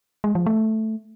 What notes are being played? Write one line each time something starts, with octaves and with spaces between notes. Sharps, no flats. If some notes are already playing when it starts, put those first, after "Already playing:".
G#3
F3
A3